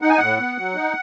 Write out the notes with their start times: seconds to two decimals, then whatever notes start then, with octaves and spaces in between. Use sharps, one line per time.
0.02 D#4 F#5
0.10 G#5
0.18 A2 F#5
0.39 B3
0.58 F#3
0.75 D#4